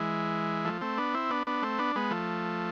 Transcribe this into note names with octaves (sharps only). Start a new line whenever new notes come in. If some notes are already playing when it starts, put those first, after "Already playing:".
Already playing: E3 G#3
F3 A3
A3 C4
B3 D4
C4 E4
B3 D4
B3 D4
A3 C4
B3 D4
G#3 B3
F3 A3